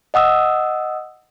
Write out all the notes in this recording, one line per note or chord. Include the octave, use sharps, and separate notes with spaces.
D#5 F#5 D#6 E6